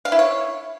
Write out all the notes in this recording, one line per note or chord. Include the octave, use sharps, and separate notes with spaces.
F5
E4
C#5